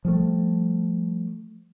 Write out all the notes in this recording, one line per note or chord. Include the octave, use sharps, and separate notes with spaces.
F3 G3 A3